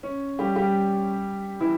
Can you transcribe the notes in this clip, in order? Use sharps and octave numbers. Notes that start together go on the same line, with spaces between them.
C#4
G3 G4
G3 G4
E3 E4